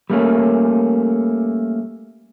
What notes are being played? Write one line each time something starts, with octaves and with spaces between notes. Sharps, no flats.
G3 A3 A#3 C#4